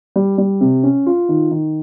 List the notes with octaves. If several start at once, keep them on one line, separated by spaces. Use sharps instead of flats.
G3
G3
C3
C#4
F4
D#3
D#3